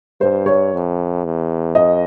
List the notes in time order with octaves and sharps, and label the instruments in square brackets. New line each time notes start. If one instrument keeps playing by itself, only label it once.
[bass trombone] G2 [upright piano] C5
[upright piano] C#5
[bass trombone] F2
E2
[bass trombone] F2 [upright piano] D#5